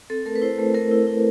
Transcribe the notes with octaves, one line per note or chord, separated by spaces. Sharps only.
C4 A4
A3 A#4
B4
E4 C5
A3
A3 A#4
E4
E4